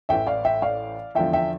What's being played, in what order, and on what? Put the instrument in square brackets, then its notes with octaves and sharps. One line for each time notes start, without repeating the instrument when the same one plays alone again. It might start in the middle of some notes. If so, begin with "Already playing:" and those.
[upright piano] A1 A2 E3 E5 G5
D5 F5
E5 G5
D5 F5
E2 D3 F3 E5 G5
E5 G5